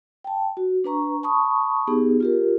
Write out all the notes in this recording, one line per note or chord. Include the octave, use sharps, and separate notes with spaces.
G5 A5
F#4
D4 B4 A#5 C#6
A5 B5 C#6 D#6
B3 D#4 G4 G#4
F4 G4 A#4